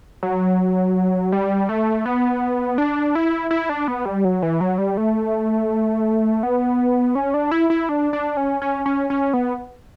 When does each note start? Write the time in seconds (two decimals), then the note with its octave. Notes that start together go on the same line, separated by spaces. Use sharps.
0.23 F#3
1.32 G3
1.69 A3
2.06 B3
2.78 D4
3.15 E4
3.51 E4
3.69 D4
3.88 B3
4.05 G3
4.25 F#3
4.42 E3
4.61 F#3
4.78 G3
4.97 A3
6.43 B3
7.15 C#4
7.34 D4
7.51 E4
7.70 E4
7.89 D4
8.13 D4
8.37 C#4
8.62 C#4
8.86 C#4
9.10 C#4
9.34 B3